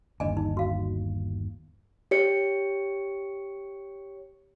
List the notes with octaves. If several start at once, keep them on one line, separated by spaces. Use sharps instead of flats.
G1 D#2 D4 D#5 G#5
D#4
F#4 F5
G4 C#5 C#7